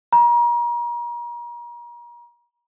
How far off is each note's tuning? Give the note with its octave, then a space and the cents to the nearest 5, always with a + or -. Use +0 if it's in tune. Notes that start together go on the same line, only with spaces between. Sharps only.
A#5 +35